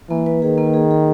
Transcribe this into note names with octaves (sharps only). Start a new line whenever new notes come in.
E3 A#3
B4
D#3 G#4
A#3
G#4
G#4